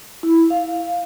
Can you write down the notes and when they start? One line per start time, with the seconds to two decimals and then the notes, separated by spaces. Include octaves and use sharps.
0.23 E4
0.50 F5